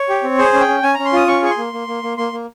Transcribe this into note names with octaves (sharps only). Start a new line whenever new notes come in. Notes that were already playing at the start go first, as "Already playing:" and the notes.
Already playing: C#5
G4
C4
G#4 C5
C#4
G5
C#4
C#4 G#5
C#4 A#5
C6
F4 D#6
C#4 C#6
G#4 C#6
C6
A#3
A#3
A#3
A#3
A#3 C6
A#3